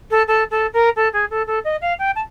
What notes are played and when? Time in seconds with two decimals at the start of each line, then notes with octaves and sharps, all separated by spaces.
0.11 A4
0.27 A4
0.51 A4
0.73 A#4
0.96 A4
1.13 G#4
1.30 A4
1.47 A4
1.64 D#5
1.81 F5
1.99 G5
2.15 A5